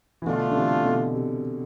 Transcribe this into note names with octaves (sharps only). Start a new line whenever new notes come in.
E3
B2 D3 A3 D4 F4
D3
C3 E3
B2 D3
C3